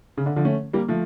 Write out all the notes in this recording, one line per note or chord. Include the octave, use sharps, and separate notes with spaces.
C#3
D3
D3 F3
A3 C#4
G3 A#3
F3 A3